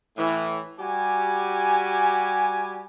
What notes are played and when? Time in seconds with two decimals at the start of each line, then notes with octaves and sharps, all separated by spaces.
0.17 A2 E3
0.79 G3 F#4 G4 G#5